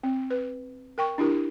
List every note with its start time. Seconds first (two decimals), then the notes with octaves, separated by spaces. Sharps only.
0.03 C4
0.30 B4
0.98 A#4 G5 C#6
1.18 D4 E4 G4 A#4